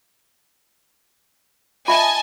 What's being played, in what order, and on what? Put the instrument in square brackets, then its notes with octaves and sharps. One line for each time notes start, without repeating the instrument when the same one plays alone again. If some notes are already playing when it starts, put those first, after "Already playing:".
[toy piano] F4 E5 [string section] D#5 G#5 A5